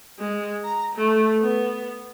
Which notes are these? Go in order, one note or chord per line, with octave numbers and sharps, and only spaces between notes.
G#3
A#5
A3
B3